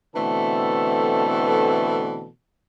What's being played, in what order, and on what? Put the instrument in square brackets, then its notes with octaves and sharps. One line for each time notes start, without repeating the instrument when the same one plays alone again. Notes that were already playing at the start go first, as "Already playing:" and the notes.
[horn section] B2 D3 E3 A3 C4 A4